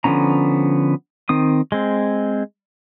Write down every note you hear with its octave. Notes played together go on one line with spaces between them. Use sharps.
D3 F3 B3 C#4 A#5
D#3 C4 D#6
G#3 C4